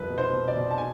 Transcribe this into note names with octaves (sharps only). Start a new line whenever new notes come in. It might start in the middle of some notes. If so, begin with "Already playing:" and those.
Already playing: C2 F2 B4
B2
C5
B2
D5
B2
A5
G#5